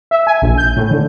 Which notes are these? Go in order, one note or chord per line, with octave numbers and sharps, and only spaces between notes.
E5
G#5
A#1
G6
A2
D3